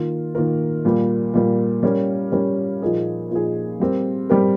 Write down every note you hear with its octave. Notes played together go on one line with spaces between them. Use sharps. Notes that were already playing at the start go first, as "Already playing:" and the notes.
Already playing: D#3 A#3 F4 A#4
D#3 A#3 F4 A#4
A#2 G3 A#3
A#2 G3 A#3
G3 C#4 G4 A#4
G3 C#4 G4 A#4
A#2 F3 A#3 D#4 G#4
A#2 F3 A#3 D#4 G#4
G3 C4 G4 A#4
G3 C4 G4 A#4